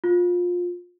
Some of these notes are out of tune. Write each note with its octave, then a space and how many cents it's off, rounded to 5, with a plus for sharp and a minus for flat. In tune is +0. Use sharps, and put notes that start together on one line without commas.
F4 +20